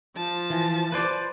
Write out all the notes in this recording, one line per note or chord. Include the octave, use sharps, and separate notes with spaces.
F3 A5
E3
B4 C5 D5